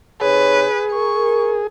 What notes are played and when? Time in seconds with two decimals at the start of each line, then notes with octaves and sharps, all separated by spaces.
0.21 C3 D#4 G#4 B4 C#5
0.91 A#4 C#6